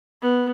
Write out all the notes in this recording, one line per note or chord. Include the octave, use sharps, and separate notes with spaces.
B3